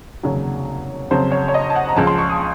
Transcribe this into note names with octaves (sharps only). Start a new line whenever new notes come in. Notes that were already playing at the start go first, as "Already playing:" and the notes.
F1 D#2 C#3 F#3 C#5
F2 C#3 F#3 C5
C#5
C#5
D#5
A5
F#5
A#5
C#2 C#3 F3 A5
C6
C#6
D#6